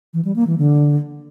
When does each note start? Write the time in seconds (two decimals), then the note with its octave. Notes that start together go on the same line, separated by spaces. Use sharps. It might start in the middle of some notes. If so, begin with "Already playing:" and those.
0.14 E3
0.25 G3
0.36 A#3
0.47 E3
0.58 D3